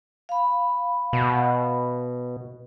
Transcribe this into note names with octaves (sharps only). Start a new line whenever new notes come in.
F5 B5
B2